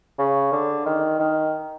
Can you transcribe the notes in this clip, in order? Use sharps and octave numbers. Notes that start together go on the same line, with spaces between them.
C#3
D3
D#3
D#3